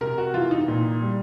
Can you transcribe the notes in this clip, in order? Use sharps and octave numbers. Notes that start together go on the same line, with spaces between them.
C3 A#4
F#4
E3 F4
D#4
A#2
G3